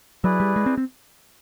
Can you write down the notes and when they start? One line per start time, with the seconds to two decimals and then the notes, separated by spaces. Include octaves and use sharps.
0.24 F#3 E4 G#4 B4 D5
0.40 G3
0.56 G#3
0.66 C4
0.78 C4